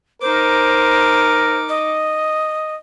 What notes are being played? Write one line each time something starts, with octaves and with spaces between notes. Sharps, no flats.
D#4 A#4 C5 D6
D#5